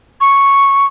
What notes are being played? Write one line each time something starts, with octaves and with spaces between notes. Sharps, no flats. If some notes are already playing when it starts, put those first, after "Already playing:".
C#6